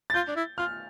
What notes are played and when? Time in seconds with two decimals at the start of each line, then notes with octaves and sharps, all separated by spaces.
0.10 A6
0.14 F4 G6
0.28 D4
0.36 E4
0.58 F4 F6